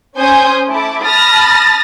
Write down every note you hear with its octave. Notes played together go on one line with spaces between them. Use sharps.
C#4 C5 G#5 D#6 G6
A3 E4 A5 D6
A5 B5 D#6 F6 A6 A#6